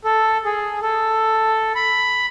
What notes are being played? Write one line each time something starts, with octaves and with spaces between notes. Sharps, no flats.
A4
G#4
A4
B5